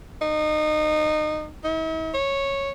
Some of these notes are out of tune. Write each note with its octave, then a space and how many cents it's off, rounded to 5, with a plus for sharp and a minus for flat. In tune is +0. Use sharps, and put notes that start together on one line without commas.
D#4 -25
E4 -45
C#5 -10